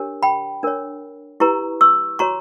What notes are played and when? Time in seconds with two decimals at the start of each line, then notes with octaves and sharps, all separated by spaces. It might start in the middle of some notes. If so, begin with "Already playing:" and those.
Already playing: D4 G4 A#4 C#5
0.23 G5 B5
0.63 D4 A#4 C#5
1.40 E4 G4 B4 A#5 C#6
1.81 C#6 E6
2.19 F#4 C#5 A#5 C#6